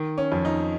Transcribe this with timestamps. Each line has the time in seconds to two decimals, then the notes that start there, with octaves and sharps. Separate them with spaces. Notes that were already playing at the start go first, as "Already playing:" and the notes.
Already playing: D#3
0.18 C#4
0.32 F2
0.45 D#4